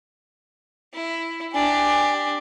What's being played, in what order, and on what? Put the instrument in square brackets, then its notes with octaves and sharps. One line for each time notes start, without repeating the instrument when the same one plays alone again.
[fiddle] E4
[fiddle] D4 G4 [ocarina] G#5